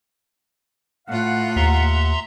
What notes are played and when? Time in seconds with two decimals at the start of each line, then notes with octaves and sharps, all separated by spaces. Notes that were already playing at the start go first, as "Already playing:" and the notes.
1.08 A2 F4 F5 F#5
1.56 D#2 E5 A#5 C6